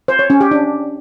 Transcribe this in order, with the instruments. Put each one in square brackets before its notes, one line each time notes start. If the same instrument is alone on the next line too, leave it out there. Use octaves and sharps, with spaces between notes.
[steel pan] C5
C#5
C#4
G4
D4